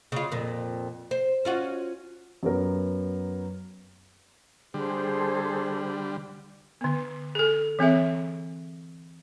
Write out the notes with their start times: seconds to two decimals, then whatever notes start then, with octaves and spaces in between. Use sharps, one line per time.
0.12 C#3 F4
0.32 F2 A#2
1.11 C5
1.45 C#4 F4 F#4
2.43 F#2 B3 A#4
4.74 D3 G3 G#4 A4 C5
6.81 D3 B3
7.35 G#4 A4
7.79 E3 C4 G#4 E5